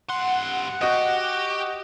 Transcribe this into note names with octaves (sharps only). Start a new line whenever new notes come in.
G2 F#5 C6
F#4 G4 D#5